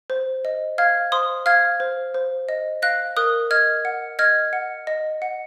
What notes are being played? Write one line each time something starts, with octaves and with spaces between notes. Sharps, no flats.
C5
D#5
F5 F6 G#6
C5 C6 D#6
F5 F6 G#6
C5
C5
D#5
F5 F#6 A#6
A#4 D#6 F#6
D#5 F6 G#6
F#5
D#5 F6 G#6
F#5
D#5
F#5